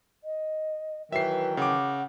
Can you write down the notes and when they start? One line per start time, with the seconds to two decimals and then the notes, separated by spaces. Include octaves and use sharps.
0.24 D#5
1.12 D#3 E3 F#3 B4 E5 C7
1.57 C#3 F#5 D6